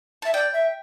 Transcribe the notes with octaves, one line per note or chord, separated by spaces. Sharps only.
E5 A5
D5 G5
E5